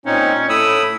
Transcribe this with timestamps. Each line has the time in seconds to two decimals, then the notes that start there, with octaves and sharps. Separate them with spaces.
0.06 A#2 C4 C#4 D#4
0.49 A2 B5 D#6 E6